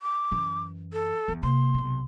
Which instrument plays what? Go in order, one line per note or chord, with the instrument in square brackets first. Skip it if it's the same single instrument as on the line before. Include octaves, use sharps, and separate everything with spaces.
[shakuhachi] D6
[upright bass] F#2 E3
[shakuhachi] A4
[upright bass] E2 E3
[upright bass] C3 A#3 [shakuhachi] C6
[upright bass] B1 C3